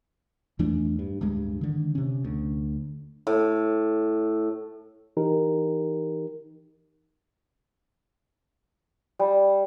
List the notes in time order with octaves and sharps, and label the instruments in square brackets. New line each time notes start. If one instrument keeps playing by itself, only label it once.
[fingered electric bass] E2 E3 A3 D4
G2
D1 G2 G#3
D3 D#3
C3 C#4
D2
[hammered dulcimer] A2
[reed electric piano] E3 D#4 G4 A#4
[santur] G3